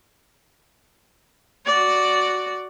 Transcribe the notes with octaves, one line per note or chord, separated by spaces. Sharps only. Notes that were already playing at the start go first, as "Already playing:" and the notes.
F#4 D5